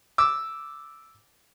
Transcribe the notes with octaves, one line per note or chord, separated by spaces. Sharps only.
D6 E6